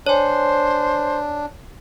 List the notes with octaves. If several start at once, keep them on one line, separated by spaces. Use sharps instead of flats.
D4 C5 C#5 G#5